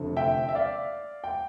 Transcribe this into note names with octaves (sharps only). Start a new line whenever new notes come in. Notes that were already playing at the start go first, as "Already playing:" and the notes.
Already playing: F1 F2 D3 A3
E5 G5
E5
D5 F5
G5